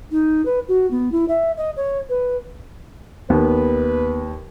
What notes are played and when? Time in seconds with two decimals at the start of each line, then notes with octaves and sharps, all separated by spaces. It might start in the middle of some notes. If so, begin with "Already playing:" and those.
0.11 D#4
0.45 B4
0.68 F#4
0.91 B3
1.12 E4
1.28 E5
1.57 D#5
1.76 C#5
2.09 B4
3.30 D#2 B3 B4